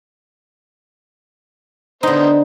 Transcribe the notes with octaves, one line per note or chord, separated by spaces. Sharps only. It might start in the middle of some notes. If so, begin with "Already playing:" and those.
D3 B3 D#4 C5